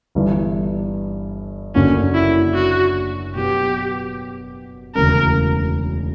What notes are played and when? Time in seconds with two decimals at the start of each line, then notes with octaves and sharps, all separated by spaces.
0.15 G1 G2 E3
1.75 F#1 F#2 D3 A#3 C#4 D4
2.14 E4
2.55 F#4
3.35 B2 F#3 B3 G4
4.95 E1 D2 C#3 A#4